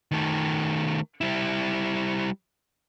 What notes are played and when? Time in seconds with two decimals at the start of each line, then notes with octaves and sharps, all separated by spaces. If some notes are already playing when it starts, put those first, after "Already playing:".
0.11 D#3 A3
1.21 G3 E4